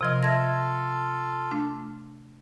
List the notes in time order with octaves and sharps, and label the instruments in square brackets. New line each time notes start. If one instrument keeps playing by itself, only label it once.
[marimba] C3 F3 D#5 [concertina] F4 A#4
[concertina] F4 A4 [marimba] E5 G#6 A#6
[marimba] A3 D4